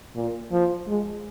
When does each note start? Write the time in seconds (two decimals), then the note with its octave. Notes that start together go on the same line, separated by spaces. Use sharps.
0.15 A#2
0.52 F3
0.88 G#3